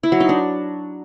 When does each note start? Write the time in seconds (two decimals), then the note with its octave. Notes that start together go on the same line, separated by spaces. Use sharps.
0.03 E4
0.12 F#3
0.20 D#4
0.29 D4